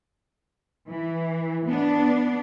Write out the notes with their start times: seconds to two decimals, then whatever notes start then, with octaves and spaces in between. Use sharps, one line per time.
0.89 E3
1.67 B3 D4